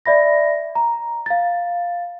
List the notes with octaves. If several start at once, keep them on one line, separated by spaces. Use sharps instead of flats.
D5 E5 B5 A#6
A#5
F5 A6